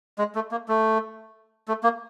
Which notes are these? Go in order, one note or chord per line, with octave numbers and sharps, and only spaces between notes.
G#3
A3
A#3
A3
A3
A#3